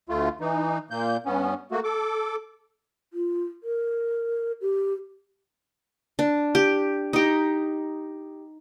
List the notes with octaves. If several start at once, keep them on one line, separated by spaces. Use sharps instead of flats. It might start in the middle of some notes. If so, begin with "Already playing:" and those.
D2 A3 F4
E3 D#4
A#2 A#3 G6
G2 B3 C#4
A3 A#3 F#4
A4 D6
F4
A#4
G4
D4
G4
D#4 G4